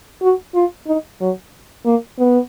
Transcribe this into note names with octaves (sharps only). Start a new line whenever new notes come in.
F#4
F4
D#4
F#3
A#3
B3